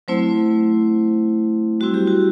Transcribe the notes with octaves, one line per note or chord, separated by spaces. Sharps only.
F#3 A3 C4 E4 C5
G3 C4 E4 F#4
G4
F#4